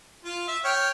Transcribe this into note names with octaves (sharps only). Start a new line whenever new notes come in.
F4
E5
C#5 G5 F6